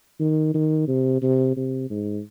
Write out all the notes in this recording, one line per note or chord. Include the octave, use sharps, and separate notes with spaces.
D#3
D#3
C3
C3
C3
G#2